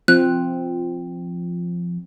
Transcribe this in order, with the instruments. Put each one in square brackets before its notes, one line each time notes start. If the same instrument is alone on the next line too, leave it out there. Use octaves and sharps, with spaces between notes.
[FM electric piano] F3 [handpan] C4 [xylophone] F#6